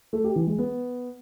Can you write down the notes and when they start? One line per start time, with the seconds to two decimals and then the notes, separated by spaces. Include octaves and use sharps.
0.13 A3
0.24 G4
0.36 E3
0.47 G#3
0.58 B3